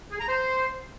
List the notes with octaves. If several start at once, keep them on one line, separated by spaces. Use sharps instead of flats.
G#4
A#5
C5